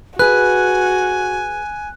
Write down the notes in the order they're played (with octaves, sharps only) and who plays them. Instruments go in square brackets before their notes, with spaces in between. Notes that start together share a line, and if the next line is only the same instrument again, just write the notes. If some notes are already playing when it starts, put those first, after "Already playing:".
[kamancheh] F#4 [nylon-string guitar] G#4 B4 [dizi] G#5 [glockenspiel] F#6